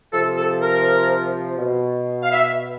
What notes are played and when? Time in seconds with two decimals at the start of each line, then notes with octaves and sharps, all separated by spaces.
0.12 C3 F3 A4
0.37 A4
0.61 A#4
1.58 B2
2.22 F5
2.32 E5